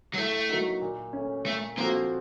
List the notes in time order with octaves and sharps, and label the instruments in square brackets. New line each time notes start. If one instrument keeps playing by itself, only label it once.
[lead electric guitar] F#3
[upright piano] A2 [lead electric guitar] A3
[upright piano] F#3 A#3 D#4 F#4
A#2
A3 C#4
[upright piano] A#2 [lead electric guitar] A3
[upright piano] F3 C4 F#4 A4 [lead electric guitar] A#3